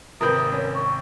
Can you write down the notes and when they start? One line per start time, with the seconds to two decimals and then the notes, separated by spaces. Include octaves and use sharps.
0.21 G#1 C3 A#4 B4 D#6 G6
0.52 C#4 A#4
0.74 C#6